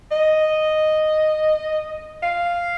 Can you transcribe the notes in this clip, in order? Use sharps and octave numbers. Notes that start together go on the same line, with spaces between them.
D#5
F5